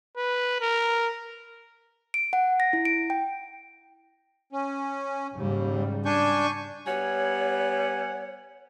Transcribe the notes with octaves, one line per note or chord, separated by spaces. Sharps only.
B4
A#4
D7
F#5
A#6
E4
D7
G5
C#4
D#2 G#2 C#3 G3
D4 G#5 C#6 G6
G3 B3 C#5 F#5 G#5